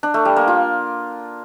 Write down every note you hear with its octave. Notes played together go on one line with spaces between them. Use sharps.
D4
A3
G3
A#3
F4